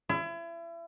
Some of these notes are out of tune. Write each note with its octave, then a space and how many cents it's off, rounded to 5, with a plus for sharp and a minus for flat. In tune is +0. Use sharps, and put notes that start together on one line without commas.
E4 +35